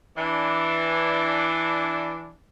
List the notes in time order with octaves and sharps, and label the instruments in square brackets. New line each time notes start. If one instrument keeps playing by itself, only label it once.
[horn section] E3 D4